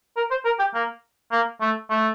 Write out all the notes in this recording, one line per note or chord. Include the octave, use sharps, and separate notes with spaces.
A#4
C5
A#4
G4
A#3
A#3
A3
A3